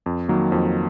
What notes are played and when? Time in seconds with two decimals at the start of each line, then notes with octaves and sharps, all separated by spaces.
0.06 F2
0.29 D#3 F#3 A#3
0.52 F2